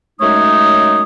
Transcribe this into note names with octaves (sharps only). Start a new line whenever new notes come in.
F#2 G#3 A3 D#4 C#5 D#6